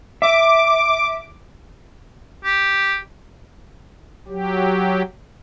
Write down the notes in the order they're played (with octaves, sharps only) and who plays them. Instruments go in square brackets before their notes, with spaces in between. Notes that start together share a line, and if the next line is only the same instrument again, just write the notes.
[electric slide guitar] E5 [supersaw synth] D6
[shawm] G4
[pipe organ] F#3 G4